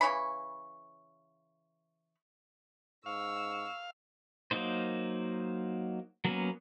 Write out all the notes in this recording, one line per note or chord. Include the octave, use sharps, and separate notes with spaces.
C#3 E3 C#5 B5
G#2 F5 C#6 E6
F#3 A#3 D#4 C5
F#3 A#3 B3 C#4